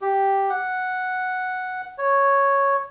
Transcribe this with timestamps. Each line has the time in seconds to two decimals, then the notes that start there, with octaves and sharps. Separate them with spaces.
0.02 G4
0.50 F#5
1.98 C#5